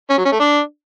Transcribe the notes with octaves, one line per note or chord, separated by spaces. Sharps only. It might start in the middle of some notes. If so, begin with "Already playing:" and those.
C#4
F#3
C#4
A3
D4